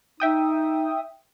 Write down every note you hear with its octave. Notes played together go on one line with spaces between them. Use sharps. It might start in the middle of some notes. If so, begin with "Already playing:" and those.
D#4 E5 G5 D#6